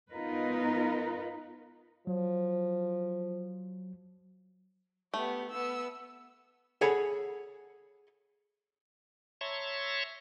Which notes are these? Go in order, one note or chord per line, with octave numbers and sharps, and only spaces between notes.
B3 D#4 F4 A#4 B4
F3 F#3
A3 B3 G4
B3 E6
G#4 A4 C#5 F#5 G#5 B5
C#5 E5 A5 A#5 C6 C#6